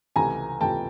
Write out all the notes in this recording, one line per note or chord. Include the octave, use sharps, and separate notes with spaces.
C#2 C3 E3 A3 G#5 A#5
C#2 C3 E3 A3 G5 A5